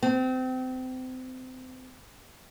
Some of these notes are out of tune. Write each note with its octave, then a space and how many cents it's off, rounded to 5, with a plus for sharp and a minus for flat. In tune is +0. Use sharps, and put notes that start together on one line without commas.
C4 -30